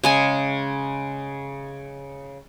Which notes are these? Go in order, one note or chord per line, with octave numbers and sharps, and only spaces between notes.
C#3 G#3 G#5